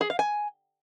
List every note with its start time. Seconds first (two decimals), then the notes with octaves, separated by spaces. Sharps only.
0.01 G#4
0.10 F5
0.19 G#5